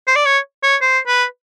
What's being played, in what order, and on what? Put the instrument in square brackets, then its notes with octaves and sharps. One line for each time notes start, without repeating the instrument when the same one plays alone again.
[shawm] C5
D5
C#5
C#5
C5
B4